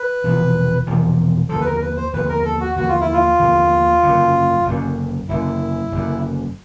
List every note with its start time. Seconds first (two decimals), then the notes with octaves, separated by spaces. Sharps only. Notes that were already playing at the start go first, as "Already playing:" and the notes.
Already playing: B4
0.24 E1 E2 C3 F3
0.87 E1 E2 C3 F3
1.49 D#2 D3 F3 A4
1.60 B4
1.65 A#4
1.82 B4
1.97 C5
2.13 D#2 D3 F3 B4
2.29 A#4
2.45 A4
2.60 F#4
2.76 D#2 D3 F3 F#4
2.88 F4
3.01 E4
3.13 F4
3.39 D#2 D3 F3
4.03 F#1 F#2 D3
4.66 F#1 F#2 D3
5.29 F#1 F#2 D3 E4
5.92 F#1 F#2 D3